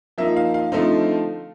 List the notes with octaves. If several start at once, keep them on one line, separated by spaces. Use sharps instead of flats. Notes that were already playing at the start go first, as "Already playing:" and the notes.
F3 A#3 D#4 E5
F5
F5
D3 F3 A3 C4 D#4